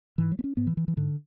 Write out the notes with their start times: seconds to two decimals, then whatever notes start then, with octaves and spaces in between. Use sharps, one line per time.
0.18 G#2 E3
0.32 F#3
0.39 B3
0.44 C#4
0.57 G#2 B3
0.67 E3
0.77 E3
0.88 E3
0.97 G#2 D3